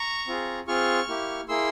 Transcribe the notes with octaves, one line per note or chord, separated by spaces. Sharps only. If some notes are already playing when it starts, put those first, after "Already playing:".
Already playing: A#5 C#6
C4 F4 G#4
C4 F4 G#4 C#6 F6
A#3 E4 G4
A#3 E4 G#4 C6 E6